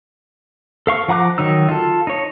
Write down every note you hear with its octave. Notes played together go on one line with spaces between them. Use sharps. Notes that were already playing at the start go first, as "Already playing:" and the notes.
A4 F5 C#6
F3 F#5 A#5 D6 F#6
D#3 F#3 D#4 E6
F4 A4
D#4 C#5